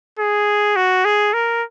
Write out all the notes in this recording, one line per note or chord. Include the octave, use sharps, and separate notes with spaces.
G#4
F#4
G#4
A#4